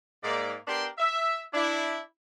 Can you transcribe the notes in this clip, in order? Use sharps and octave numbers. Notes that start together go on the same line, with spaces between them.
G#2 A#3 D5
B3 D4 G4 A#4 G5 C6
E5
D4 E4